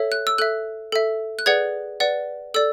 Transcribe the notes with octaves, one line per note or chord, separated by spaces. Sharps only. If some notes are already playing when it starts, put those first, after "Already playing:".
Already playing: A4 C#5 E5
F#6
E6
A4 E5 F#6
A4 E5
F#6
G#4 B4 D5 F#5 G#6
B4 D5 F#5
A4 D5 E6